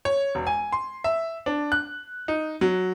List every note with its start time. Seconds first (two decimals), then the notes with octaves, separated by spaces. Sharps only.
0.05 C#5
0.35 E1
0.47 G#5
0.72 C6
1.04 E5
1.46 D4
1.72 F#6
2.28 D#4
2.61 F#3